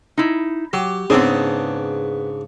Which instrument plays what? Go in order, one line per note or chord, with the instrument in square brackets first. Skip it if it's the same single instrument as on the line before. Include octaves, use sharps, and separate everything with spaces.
[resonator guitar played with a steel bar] D#4 E4
[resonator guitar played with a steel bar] F#3 [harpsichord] G4
[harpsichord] G#2 C#3 D4 [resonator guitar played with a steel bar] B3 C4 G#4